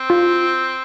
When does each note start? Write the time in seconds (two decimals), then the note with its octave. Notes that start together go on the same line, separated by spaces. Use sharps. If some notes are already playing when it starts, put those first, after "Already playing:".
Already playing: C4
0.10 F4